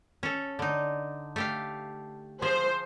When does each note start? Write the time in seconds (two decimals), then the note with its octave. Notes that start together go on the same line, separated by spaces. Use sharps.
0.23 C#4 A4
0.59 D3 D#4
1.36 A3 G4 F5
2.42 F3 G#4 C5